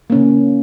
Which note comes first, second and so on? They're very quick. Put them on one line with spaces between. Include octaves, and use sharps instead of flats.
A#3 C#4 C#3